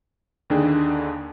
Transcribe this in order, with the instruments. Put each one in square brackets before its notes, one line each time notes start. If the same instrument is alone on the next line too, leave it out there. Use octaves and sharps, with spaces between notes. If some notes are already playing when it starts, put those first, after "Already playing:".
[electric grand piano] D#2 D3 D#3 D4 G#4 G5